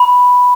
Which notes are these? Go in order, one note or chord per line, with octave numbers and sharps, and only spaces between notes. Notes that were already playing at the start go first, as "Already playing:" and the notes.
Already playing: B5